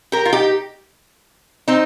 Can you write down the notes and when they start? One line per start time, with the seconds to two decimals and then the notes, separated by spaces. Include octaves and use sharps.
0.12 G4 A#4
0.25 F4
0.33 D#4 G4
1.68 C4 D#4